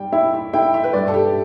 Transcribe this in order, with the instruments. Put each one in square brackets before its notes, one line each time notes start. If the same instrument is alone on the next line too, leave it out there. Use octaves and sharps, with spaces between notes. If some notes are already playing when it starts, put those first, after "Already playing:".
Already playing: [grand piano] G3 [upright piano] G5
[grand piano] E4 [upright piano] E5
[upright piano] E5
[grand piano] E4 [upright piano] G5
[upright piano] E5
B4
[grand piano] G2 [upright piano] D5
[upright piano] A4
G4